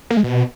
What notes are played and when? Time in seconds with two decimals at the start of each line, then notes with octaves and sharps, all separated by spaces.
0.10 A#3
0.17 G#3
0.23 B2